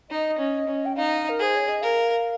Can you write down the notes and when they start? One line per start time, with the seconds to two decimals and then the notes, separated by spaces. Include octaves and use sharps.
0.10 D#4 D#5
0.38 C#4
0.67 C#4
0.86 G5
0.96 D#4 F5
1.29 A#4
1.39 G#4 C5
1.56 C#5
1.69 D#5
1.82 A#4 F5